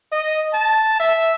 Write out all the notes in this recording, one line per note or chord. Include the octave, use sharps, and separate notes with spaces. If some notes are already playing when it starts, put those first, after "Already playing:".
D#5
A5
E5